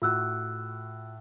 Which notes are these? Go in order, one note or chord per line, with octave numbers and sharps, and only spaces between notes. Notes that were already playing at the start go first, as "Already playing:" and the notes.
A2 F4 F#4 E6 F#6